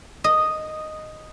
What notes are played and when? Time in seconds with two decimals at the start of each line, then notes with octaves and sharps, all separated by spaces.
0.24 D#5